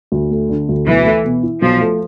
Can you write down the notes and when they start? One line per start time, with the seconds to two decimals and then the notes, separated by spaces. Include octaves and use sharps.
0.12 D2
0.30 A3
0.49 D3
0.69 D2
0.86 B1 E3
1.05 A3
1.24 B2
1.43 E4
1.61 B1 F3
1.80 A3